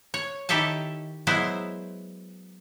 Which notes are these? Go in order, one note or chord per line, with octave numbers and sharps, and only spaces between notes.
C#5
D#3 E4 G4 A4 E5 A5
F#3 G#3 B3 E4 C5